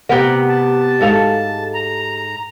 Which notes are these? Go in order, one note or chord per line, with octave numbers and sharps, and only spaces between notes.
C3 B3 G4 A#4 F#5
A5
G#2 A4 F5
A#5